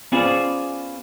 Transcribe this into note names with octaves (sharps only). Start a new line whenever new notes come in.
B3 C#4 F4 G#4 C5 D5